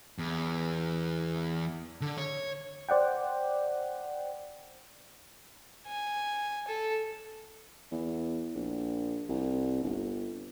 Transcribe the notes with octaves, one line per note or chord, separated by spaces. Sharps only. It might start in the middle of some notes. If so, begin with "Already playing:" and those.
E2
D3
C#5
C5 D5 F#5 G5
G#5
A4
E2
A#1
C2
G1